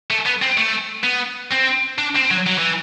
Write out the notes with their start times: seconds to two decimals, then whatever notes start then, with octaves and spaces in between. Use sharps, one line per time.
0.10 A3
0.26 B3
0.42 C4
0.58 A3
1.04 B3
1.52 C4
1.98 D4
2.15 C4
2.31 F#3
2.46 F#3
2.58 E3